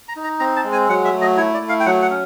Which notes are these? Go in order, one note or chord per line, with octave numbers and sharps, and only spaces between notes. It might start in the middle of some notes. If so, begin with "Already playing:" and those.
A#5
D#4
A#5
C4 A#5
A5
G#3
G#5
F#3 F#5
E5
A3
D#5
E4 C#5
D5
A3
F5
G5
F#3 F#5
F#5
C#4